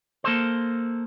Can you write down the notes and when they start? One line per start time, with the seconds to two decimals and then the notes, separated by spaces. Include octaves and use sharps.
0.24 A#3 A4 C5